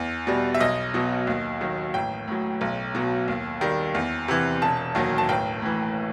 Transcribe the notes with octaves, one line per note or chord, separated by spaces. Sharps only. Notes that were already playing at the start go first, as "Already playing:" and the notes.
Already playing: E2
B2 G3
E5
B1 D#5
B2 F#3
D#2
D#3 F#3
A1 G5
A2 F#3
B1
B2 F#3
D#2
D#3 G3
E2
C3 E3
E1 A5
D#2 D#3 F#3
A5
A1 G5
A2 E3